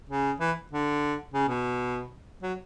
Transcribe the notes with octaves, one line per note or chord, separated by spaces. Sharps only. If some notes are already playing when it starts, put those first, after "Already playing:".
C#3
E3
D3
C#3
B2
F#3